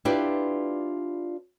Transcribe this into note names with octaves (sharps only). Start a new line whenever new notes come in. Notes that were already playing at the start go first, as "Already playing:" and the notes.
D4 E4 F4 G4 B4 D5